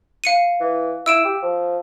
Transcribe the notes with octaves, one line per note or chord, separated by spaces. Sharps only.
F5 C#7 D#7
E3
E4 E6 D7 E7
G4
F3